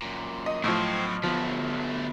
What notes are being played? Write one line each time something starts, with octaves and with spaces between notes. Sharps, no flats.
F#2 A#2
D#5
A2 F3 F#3 C4 D#5
D3 F3 F#3 A3 B3